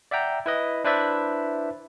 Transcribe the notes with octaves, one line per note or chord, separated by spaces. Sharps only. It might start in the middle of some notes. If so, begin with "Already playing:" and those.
D5 E5 F#5 G5 A#5
E4 B4 D#5
D4 E4 B4 C5 D5 E5